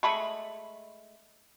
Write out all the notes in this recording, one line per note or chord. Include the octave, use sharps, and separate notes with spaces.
G#3 A3 B5 C#6